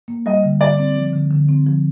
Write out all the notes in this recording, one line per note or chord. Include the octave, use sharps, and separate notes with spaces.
A#3
G3 D#5
D3
D3 D5
C4
F3
D3
D3
C4
F3